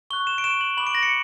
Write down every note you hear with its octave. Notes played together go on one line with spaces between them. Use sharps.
C#6 F#6 G7
E7
D7
C#6 F#6 E7
F#7
B5 D6 F#6 F#7
D7
A#6
C#7